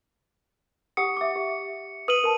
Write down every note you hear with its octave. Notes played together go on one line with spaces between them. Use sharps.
G4 F#5 D#6 C#7
E5 D6
G4
B4 D#6 D#7 F#7
A#4 A5